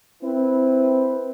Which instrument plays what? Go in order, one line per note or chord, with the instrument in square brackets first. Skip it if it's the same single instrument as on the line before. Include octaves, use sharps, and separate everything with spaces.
[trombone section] C4 E4 B4